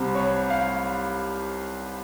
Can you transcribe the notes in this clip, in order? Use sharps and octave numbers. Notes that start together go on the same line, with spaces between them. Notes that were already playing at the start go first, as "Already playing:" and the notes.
Already playing: C2 C3 G3 C4 C5
C#5
F5